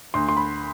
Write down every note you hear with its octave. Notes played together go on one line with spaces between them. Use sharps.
D2 C6
C6
B5